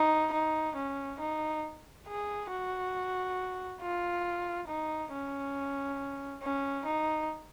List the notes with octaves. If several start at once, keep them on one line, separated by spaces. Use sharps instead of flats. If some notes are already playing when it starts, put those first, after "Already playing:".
Already playing: D#4
D#4
C#4
D#4
G#4
F#4
F4
D#4
C#4
C#4
D#4